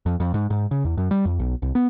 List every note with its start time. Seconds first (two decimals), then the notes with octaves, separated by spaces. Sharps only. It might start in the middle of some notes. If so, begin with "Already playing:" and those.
0.06 F2
0.20 F2
0.34 G#2
0.50 G#2
0.71 C#3
0.85 E2
0.97 F#2
1.11 G3
1.25 F2
1.39 B1
1.62 C2
1.75 B3